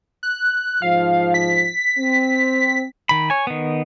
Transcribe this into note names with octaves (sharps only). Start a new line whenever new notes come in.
F#6
G#2 F3 F5
B6
C4
D#3 B5
C#5 G#5
D#3 B3